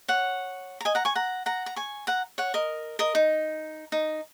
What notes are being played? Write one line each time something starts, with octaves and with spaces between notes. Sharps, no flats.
C#5 F#5
A#5
D#5 G#5
F#5 A#5
G#5 C#6
F#5 A#5
F#5 A#5
A#5
G#5 C#6
F#5 A#5
C#5 F#5
A#4 D#5
A#4 D#5
D#4
D#4